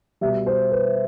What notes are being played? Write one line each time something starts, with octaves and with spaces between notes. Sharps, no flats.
B2 G3 E5
C5
B4